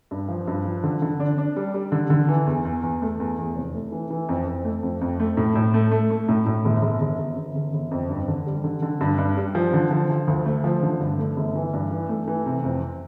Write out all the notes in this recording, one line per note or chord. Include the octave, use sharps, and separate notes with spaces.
G2
F3
G2
F3
D3
D3
D4
D4
G3
G3
D3
D3
E3
E2
E2
E2
A3
E2
E2
F1
A3
E3
E3
F2
F2
A3
F2
F2
A3
A2
A2
A3
A3
A3
A2
A2
G1
G1
G1
G1
G1
G1
G1
F2
G2
D3
G3
D3
D3
G2
G2
G3
F3
D3
F3
F3
D2
A3
F3
D3
G2
A3
G1
E3
G2
E3
A3
E3
C3
F2